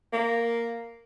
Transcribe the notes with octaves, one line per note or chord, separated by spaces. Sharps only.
A#3